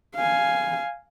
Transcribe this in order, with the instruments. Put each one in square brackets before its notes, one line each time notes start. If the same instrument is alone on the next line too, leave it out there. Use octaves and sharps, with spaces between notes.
[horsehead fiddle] F5 G#5